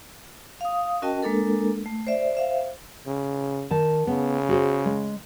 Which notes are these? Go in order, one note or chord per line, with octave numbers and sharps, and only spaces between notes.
F5 D#6
C#4 F#4 A#4 D#5 G5 A5
G#3 A#3 D4 A4 A#4
A3
C5 D5 E5
C5 E5 F5
C#3
D#3 A5
C#3 B3
F#4 G#4 C5
G#3